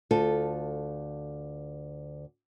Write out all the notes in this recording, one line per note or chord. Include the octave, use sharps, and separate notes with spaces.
D2 F4 A4